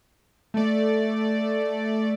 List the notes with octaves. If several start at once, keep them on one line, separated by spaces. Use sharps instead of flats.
A3 D5